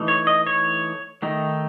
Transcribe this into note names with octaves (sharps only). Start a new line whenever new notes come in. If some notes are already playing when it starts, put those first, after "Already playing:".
Already playing: E3 A3 D#4
C#5
D#5
C#5
D#3 A3 D#4